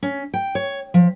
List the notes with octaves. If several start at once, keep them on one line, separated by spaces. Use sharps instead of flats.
C#4
G5
C#5
F3